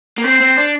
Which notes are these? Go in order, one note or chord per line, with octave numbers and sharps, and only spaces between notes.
A#3
C4 C5
C4
D4